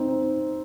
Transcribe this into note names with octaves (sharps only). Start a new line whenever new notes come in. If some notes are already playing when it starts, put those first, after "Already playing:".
Already playing: C4 D#4